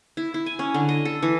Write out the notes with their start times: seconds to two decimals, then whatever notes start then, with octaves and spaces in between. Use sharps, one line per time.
0.17 E4
0.34 E4
0.46 G#5
0.59 C#4
0.74 D3
0.89 D#5
1.05 A4
1.23 E3